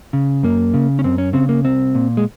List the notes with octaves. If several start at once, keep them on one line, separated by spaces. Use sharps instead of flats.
C#3
F#2 A#3
C#3
C#4
F#2 C4
C#4
C#3 C4
A#3
C2 C4
A#2
G#3